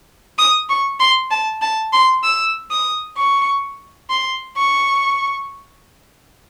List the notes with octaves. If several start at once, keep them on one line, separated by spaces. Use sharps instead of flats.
D#6
C#6
C6
A5
A5
C6
E6
D#6
C#6
C6
C#6